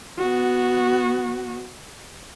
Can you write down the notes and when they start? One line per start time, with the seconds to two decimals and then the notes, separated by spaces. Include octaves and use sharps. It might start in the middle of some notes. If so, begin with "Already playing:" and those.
0.19 B3 F#4